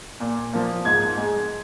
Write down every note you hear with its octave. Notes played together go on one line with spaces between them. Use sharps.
A#2
F3 A#3
G#2 G#6
G#3